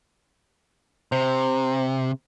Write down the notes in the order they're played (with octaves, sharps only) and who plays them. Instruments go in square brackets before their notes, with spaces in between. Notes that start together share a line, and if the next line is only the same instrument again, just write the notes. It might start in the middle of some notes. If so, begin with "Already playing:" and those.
[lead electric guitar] C3 [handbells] C5